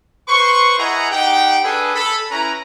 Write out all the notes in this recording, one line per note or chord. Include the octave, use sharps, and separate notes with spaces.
B4 C5 C6 C#6
E4 G#4 B4 D#5 F#5 A#5
D#4 G4 F#5 G5
D4 G#4 A4 B4
A4 B5
C#4 E4 B4 A#5